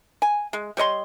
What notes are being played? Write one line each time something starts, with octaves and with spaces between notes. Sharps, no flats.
G#5
G#3
G3 C#5 D#5 C6